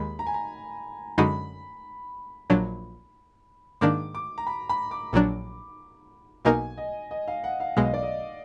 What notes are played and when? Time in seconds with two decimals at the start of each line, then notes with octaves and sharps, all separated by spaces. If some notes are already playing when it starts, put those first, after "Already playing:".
Already playing: D#2 D#3 G#3 B5
0.19 A#5
0.27 G#5
0.34 A#5
1.18 F#2 D3 G#3 D#4 F#4 B5
2.50 A#1 A#2 F#3 D4
3.81 G#2 D#3 A#3 D4 D6
4.15 D6
4.38 A#5
4.47 B5
4.69 B5
4.91 D6
5.13 A#1 A#2 F#3 D4
6.45 B1 B2 A#3 D#4 A#4 G#5
6.77 D#5
7.11 D#5
7.28 F5
7.44 F#5
7.60 F5
7.77 B1 B2 G#3 F5
7.85 D#5
7.94 D5
8.03 D#5